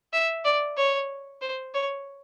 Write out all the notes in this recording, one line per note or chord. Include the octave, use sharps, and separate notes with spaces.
E5
D5
C#5
C5
C#5